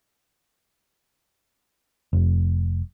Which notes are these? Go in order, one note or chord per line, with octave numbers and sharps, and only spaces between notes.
F1